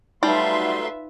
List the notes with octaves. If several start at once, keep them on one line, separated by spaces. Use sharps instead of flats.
F#3 G3 A3 D#4 F4 B4 E5 C6